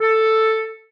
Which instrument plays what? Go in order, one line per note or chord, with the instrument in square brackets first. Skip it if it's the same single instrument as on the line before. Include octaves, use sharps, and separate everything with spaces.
[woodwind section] A4